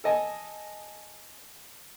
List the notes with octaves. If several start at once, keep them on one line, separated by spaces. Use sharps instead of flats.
A4 D#5 G#5